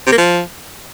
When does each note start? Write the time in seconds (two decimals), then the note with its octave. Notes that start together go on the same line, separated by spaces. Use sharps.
0.06 C3
0.12 A#3
0.18 F3